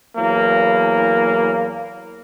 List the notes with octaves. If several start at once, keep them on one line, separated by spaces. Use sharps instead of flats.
E2 F#3 A#3